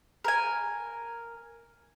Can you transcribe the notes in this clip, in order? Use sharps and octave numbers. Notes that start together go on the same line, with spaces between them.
A#4 G#5